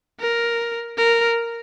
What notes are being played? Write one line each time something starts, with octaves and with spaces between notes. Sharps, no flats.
A#4
A#4